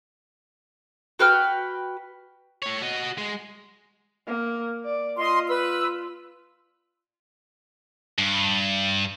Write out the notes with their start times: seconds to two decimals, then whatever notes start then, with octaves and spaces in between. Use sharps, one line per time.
1.19 F#4 B4 G5 F6
2.62 A3 C#5
2.82 F#4 D#5
3.18 G#3
4.27 A#3
4.85 D5
5.19 F4 D#5 C6
5.48 B4 E6
8.19 G2